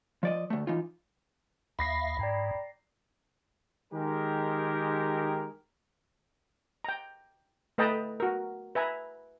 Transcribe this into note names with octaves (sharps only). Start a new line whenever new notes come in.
F3 D5 D#5
D2 A3
E3 D#4 F4
D#2 E5 F5 B5 A#6 C7
G#2 D5 G5 A#5
D#3 G#3 G4 A#4
G5 A#5
A3 B4 D#5 G5 A5 A#5
F#4 A#4
B4 E5 G#5 A#5